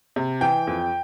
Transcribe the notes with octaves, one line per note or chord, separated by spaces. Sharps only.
C3
E3 G5
F2